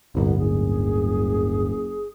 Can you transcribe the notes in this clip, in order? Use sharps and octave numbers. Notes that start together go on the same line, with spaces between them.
D1 G1 C2 B3
F#1 G#4